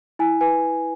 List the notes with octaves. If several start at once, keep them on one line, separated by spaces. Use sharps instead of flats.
E4 G#5
B4 G#5